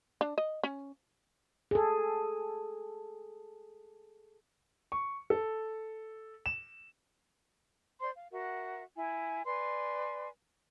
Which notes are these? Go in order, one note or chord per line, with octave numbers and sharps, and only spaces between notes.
D4
D#5
C#4
G#4 A4
C#6
A4
E7
C5 D5 C6
F5
F#4 A#4 E5 F#5
E4 G#5
B4 D5 G#5 C6